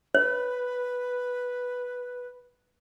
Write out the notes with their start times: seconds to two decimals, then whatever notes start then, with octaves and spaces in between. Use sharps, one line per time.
0.15 B4 C#5